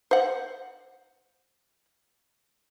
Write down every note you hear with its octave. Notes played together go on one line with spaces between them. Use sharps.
C5 F#5